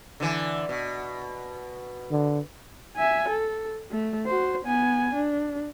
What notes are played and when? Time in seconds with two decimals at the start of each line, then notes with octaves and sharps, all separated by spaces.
0.20 D3 E3
0.69 B2
2.11 D3
2.96 E5 G#5
3.28 A4
3.91 A3
4.26 F#4 C5
4.65 B3 G#5
5.14 D4